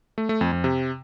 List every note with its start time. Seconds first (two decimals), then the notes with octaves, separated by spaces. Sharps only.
0.18 A3
0.29 A3
0.41 F2
0.52 F2
0.64 C3